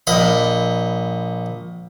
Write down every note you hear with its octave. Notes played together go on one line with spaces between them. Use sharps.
A#1 D#5 B5